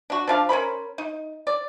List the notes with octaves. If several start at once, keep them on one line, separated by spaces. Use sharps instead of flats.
D4 F#4
F3 D4 F5
C#4 A#4 C5 B5
D#4
D5